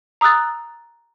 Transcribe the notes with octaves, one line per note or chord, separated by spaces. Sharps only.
A#5 D#6 E6 F#6 A6